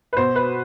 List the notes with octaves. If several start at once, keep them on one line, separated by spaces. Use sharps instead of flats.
B4
B2 C5
B4